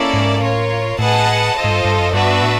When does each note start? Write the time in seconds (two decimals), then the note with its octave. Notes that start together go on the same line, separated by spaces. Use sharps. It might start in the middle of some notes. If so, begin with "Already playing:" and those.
Already playing: A#3 C#4 E4 A4 D5
0.14 G#2
0.41 A2 F4 A#4 C#5
0.99 A2 G#4 B4 D#5 F#5 A5
1.57 F4 A4 C5 D#5
1.64 G#2
1.70 G2
1.85 G2
1.99 F#2
2.13 G2 B3 D4 F#4 B4 E5
2.42 A2